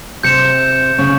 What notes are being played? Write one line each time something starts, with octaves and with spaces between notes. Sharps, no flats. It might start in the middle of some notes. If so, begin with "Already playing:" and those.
C3 C4 G6 C#7 E7
C#3 C#4